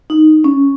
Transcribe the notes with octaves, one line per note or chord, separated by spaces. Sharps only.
D#4
C#4